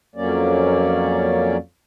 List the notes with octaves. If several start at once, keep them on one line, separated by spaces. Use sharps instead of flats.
F2 F#3 A#3 C#4 D5